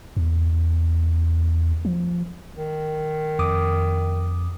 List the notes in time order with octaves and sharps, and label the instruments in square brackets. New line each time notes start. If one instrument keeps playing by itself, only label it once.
[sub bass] E2
F3
[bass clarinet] D#3
[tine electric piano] F2 D6 D#6